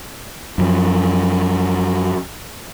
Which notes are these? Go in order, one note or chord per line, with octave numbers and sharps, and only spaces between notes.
F#2 F3